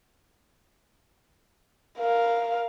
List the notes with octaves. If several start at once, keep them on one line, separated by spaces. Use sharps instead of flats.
A#4 F5